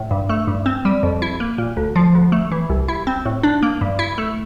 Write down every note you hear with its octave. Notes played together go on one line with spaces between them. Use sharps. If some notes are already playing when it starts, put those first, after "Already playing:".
Already playing: A2
G2
A3
G2
C4
G3
F2
E4
A#3
A#2
D2
F3
D2
A3
E3
C2
E4
C4
A2
D4
A#3
G2
E4
A3